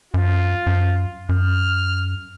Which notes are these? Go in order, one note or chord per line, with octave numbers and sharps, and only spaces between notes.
F#2 F4
F#2
F#2 F6